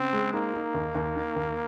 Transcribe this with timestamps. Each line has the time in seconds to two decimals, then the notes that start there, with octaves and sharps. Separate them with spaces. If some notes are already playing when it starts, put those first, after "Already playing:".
Already playing: C#3 C4
0.13 G#3
0.33 A#3 D#4
0.54 D#4
0.74 D#2
0.95 D#2
1.16 D#3
1.36 D#2